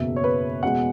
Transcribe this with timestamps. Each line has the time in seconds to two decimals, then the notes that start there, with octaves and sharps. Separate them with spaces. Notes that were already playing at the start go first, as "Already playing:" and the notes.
Already playing: F#1 E2 B2 E5
0.16 C#5
0.24 B4
0.63 E2 B2 G#3 F#5